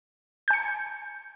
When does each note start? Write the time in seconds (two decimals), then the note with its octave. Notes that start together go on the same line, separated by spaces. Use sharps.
0.48 G6
0.50 G#5
0.53 C#7